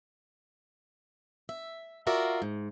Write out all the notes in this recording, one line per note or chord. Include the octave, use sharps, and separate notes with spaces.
E5
F4 F#4 A#4 D5 E5
G#2